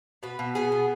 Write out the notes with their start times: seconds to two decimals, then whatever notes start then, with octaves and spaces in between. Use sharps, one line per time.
0.23 B2 B4
0.39 B2
0.55 B3 G#4
0.72 B3